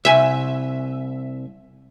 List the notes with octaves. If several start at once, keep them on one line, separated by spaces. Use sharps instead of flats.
C2 E5 G#5